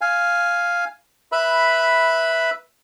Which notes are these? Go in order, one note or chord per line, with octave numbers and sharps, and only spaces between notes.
F5 G#5
B4 E5 B5